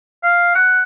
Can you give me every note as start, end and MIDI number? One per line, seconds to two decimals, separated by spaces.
0.23 0.55 77
0.55 0.83 78